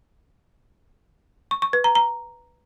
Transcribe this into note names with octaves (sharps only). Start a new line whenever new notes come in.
C#6
C#6
B4
A#5
A#5